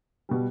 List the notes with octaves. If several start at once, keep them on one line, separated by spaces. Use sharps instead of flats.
B2 G3